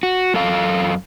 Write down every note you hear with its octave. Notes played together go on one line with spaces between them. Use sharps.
F#4
F#2 A4 F5